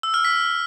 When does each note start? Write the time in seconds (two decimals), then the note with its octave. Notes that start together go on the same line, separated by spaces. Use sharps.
0.03 E6
0.14 F6
0.25 B6